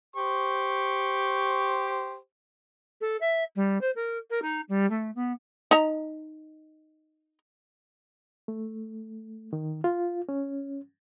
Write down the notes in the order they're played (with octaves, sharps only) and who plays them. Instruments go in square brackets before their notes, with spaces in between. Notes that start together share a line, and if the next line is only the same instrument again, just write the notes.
[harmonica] G4 C5 C#6
[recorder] A4
E5
G3
C5
A#4
A#4
D#4
G3
A3
B3
[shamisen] D#4 A#5
[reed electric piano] A3
D#3
F4
C#4